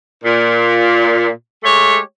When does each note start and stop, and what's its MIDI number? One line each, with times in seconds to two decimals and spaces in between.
0.24 1.28 46
1.63 1.97 56
1.63 1.97 57
1.63 1.97 67
1.63 1.97 73